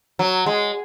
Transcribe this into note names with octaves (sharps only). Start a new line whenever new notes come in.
F#3
G#3